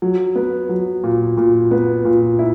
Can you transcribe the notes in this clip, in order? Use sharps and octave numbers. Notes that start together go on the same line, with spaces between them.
F#3
B3
F#3
A#2
A#2
B3
A#2
E4